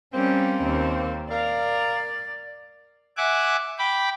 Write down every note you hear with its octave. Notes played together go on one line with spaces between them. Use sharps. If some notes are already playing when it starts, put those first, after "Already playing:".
G3 A#3 C4 C#4
D#2
A#4 D5 F5
E5 F#5 G#5 D6 F#6
G5 B5 D6